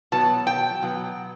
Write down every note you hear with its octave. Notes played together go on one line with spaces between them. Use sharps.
B2 F#3 B3 A5
G5
B2 F#3 B3